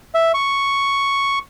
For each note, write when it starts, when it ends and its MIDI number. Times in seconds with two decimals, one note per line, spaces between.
0.15 0.32 76
0.34 1.39 85